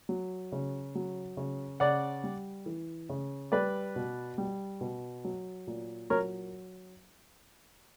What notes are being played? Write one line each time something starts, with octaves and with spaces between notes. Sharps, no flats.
F#3
C#3
F#3
C#3
C#3 D5 F#5
G3
E3
C#3
G3 B4 D5
B2
G3
B2
F#3
A#2
F#3 A#4 C#5